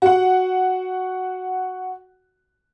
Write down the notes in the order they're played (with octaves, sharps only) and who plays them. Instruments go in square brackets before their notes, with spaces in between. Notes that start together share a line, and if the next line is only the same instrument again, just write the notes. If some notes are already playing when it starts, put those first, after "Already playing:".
[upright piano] F#4 F#5